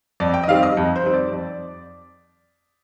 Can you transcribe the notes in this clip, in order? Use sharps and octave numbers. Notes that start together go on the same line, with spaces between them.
F2 D5
G5
D#5
D#3 G3 C4 F5
D#5
F2
C5
D#3 G3 C4
D5
F2